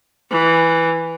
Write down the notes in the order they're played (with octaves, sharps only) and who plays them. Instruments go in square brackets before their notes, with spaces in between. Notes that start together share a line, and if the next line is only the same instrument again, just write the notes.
[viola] E3